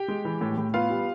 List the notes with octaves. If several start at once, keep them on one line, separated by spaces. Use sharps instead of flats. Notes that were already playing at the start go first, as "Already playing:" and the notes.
Already playing: G4 G5
G#3
E3
A2
A2
B3 F4 F5
G3